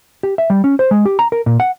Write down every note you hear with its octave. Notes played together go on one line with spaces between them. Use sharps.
G4
E5
G3
C#4
C5
G#3
G4
A#5
A#4
A#2
F#5